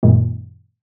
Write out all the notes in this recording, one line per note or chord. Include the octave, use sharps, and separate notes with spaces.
F#2 A#2 D#3 G#3